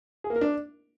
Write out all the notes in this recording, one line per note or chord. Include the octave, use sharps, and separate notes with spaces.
G#4
A#3
A#4
D4